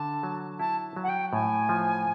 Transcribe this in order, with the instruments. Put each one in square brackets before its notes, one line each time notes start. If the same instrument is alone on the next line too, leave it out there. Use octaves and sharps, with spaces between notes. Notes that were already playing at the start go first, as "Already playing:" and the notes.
Already playing: [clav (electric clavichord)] D3 [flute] A5
[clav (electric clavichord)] F#3
[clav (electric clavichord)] E4 [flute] A5
[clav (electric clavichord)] F#3
[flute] F#5
G5
[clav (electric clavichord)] A2 [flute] G#5
[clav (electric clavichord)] F3